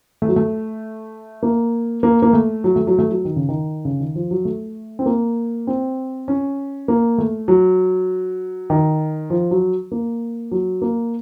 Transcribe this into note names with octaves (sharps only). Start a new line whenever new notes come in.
A3
F#3
A3
A#3
A#3
A#3
A3
F#3
A3
F#3
A3
F#3
D#3
C#3
D#3
C#3
D#3
F3
F#3
A3
C4
A#3
C4
C#4
A#3
A3
F#3
D#3
F3
F#3
A#3
F#3
A#3